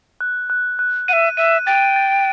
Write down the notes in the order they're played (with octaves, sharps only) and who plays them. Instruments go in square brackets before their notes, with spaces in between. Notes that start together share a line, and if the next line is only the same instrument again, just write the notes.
[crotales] F#6
F#6
F#6
[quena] F#5 [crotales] D#7
[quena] E5
[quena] E5 [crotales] D#7
[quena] G5 [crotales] A6
[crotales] A6